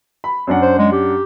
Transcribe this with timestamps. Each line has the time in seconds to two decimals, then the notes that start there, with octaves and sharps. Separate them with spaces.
0.24 B5
0.47 F#2 D4 F#5
0.62 C5
0.78 G#3
0.92 G4